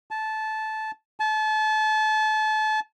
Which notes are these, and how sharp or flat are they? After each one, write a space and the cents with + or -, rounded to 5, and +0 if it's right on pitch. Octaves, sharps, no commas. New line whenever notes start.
A5 -15
A5 -30